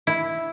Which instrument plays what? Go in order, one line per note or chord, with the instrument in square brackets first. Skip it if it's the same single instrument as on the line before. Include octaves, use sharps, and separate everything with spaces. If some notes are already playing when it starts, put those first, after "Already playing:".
[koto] E4